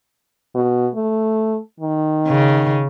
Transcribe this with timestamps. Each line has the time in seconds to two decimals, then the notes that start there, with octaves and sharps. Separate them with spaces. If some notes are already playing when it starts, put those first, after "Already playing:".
0.55 B2
0.95 A3
1.80 D#3
2.27 C#3